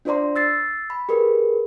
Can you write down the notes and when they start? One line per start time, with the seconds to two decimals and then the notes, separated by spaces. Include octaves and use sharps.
0.05 D4 F4 C5 D5 A#5 C6
0.36 E6 A6 C7
0.90 B5
1.09 G4 G#4 A#4 B4